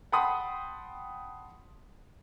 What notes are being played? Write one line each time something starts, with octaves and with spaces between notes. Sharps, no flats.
F#5 G5 A5 B5 C6 D#6